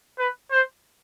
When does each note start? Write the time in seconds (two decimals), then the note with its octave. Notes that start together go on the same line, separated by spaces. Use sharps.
0.19 B4
0.52 C5